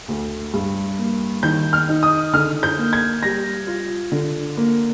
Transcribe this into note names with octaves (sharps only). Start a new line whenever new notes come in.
D2
G2
A#3
D#3 G6
F6
D#4
D#6
D3 F6
G6
A#3
G#6
G3 A#6
F4
D3
A#3